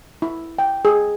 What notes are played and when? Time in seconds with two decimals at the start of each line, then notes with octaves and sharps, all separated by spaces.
0.22 E4
0.59 G5
0.85 G#4